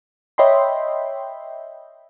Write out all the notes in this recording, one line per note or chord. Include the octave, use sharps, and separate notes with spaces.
C#5 D#5 E5 G5 B5 C6